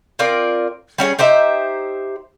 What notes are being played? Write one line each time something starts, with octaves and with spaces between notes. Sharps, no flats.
C4 F4 A#4 D5
G3 C#4 F#4 G#4
D#4 G4 C5 E5